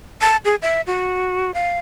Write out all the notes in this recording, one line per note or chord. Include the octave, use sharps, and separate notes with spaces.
A5
G#4
E5
F#4
F5